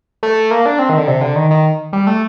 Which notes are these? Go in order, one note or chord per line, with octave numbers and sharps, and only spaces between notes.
A3
A#3
D4
C4
D#3
D3
C3
D3
D#3
D#3
G3
A3